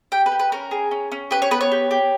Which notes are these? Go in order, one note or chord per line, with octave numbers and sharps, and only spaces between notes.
G4 G5
B4
G4
B4
C#4 A#4
G#4
C#4
C#4
G4 B4
C#5
B3 B4
C#5
G4
G4